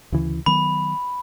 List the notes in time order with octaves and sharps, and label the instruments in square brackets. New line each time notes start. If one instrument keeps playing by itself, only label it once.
[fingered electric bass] D2 C#3 E3
[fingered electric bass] D#3 F#3 B3 [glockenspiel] B5